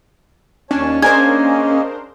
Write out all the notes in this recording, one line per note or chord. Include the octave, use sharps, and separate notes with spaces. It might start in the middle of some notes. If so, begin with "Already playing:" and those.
D#2 C#4 D4 C#5 A5
A#3 D4 G#4 A#4 C5 D#5 G#5